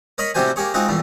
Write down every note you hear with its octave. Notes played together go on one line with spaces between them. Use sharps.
A#4 C#5 D#5 B5
A2 C3 G3 F#4 C5 G#5
A#3 G4 G#4 C#5
G#3 C4 D#4 F4 F#4
E2 G2 A#2 A3